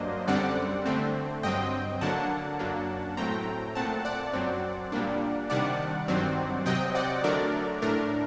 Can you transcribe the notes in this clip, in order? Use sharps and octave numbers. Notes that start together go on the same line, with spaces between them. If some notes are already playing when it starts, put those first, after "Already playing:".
Already playing: G2 F#3 A#3 D4 C5 D#5
F#2 D3 G3 C4 D5 F#5
D3 A3 C4
G2 F#3 C4 D#5 G5
D3 F#3 A#3 D4 F#5 A5
F#2 F#3 A#3 D4
A2 F#3 A3 C4 G5 A#5
A#2 A3 C4 F#5 A5
D5 F#5
F#2 F#3 C4
A#2 G3 A#3 D4
C3 D#3 G3 D4 D5 F#5
G2 D#3 F#3 C4
C3 F#3 C4 D#5 G5
D5 F#5
D3 F#3 A3 D4 A#4 D5
A2 A3 D4 A#4